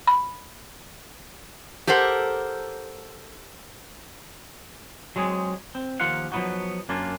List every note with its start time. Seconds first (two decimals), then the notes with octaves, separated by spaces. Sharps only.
0.07 B5
1.87 G4 A4 A#4 C5 F#5
5.16 F#3 G#3 C4 G#4
5.75 C4
6.00 D#2 F3 A#3 F4 F5 F#5
6.32 F3 F#3 A3 B3 D#4 F#4
6.89 F#2 A#3 C#4 D4 F4